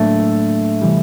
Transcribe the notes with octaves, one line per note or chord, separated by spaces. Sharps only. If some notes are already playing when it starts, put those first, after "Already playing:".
Already playing: A2 F#3 A3 A#3 D4
C3 E3 G3